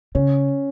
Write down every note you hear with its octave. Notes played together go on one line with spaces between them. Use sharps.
C#3 C#4